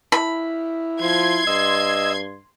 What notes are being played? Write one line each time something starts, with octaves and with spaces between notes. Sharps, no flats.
E4 B5
F3 C6 G#6
G2 D#5 E6